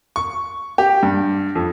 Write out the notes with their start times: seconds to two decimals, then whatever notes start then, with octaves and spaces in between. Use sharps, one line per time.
0.16 C#6
0.78 G4
1.03 G2
1.55 F2